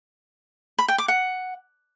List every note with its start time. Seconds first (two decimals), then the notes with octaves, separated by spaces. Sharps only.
0.78 B5
0.88 G5
0.98 D6
1.08 F#5